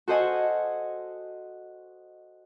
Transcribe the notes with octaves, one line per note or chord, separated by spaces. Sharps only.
F#4 A4 C5 D#5 F#5 G#5